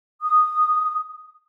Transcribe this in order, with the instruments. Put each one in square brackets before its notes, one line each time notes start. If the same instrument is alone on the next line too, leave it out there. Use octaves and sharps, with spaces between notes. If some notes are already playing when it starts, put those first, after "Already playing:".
[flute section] D#6